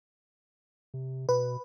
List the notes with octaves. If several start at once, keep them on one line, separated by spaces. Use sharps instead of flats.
C3
B2 B4